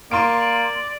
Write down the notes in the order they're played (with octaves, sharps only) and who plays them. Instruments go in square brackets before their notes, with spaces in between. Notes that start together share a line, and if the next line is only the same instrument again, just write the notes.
[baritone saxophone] A#3 [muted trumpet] D5 [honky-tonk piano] C6 D7